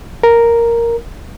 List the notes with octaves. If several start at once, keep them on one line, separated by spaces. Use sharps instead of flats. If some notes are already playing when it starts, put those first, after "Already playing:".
A#4